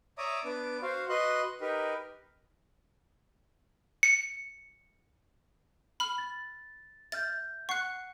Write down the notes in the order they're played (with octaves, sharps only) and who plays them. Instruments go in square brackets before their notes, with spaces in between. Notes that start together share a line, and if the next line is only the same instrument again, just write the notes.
[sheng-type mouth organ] C#5 D5 E5 A#5 D6 D#6
B3 D4 D6
F#4 C5 F5
F#4 B4 D#5 C6 F#6
D#4 G4 A#4 B4
[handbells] C#7
[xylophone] B5 F6
[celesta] A6
[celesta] E5 F6 G6 [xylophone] A6
[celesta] F#5 C7 C#7 [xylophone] C#6 F#6